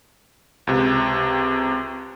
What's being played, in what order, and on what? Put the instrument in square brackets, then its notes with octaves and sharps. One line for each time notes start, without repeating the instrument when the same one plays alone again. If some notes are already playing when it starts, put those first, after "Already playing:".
[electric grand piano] C#2 C3